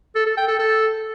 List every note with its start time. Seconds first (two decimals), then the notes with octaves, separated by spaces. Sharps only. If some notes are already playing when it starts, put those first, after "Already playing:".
0.15 A4
0.26 A4
0.37 G5
0.48 A4
0.59 A4